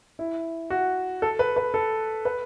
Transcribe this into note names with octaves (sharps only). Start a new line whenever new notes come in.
E4
F#4
A4
B4
B4
A4
B4